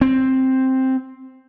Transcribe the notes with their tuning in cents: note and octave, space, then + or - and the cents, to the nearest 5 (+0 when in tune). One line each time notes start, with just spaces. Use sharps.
C4 +5